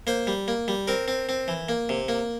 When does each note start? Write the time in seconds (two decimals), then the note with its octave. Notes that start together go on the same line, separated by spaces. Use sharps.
0.07 A#3 C5
0.27 G3
0.48 A#3
0.68 G3
0.88 C4 A#4
1.08 C4
1.29 C4
1.48 E3
1.69 A#3
1.89 C3
2.08 A#3